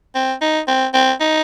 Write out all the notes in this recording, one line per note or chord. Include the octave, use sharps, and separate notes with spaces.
C4
D#4
C4
C4
D#4